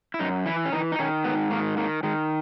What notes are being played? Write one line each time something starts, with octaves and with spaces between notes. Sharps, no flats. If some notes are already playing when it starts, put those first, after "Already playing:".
E4
F#2 D#4
E3 E4
C#4
E3 D#4
D#4
D#3 C#4
G#2 B3
D#3 A#3
D#3 A#3
D#3 G#3